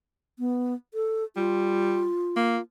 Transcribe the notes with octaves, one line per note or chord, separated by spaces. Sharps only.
B3
A4
G3 F4
A#3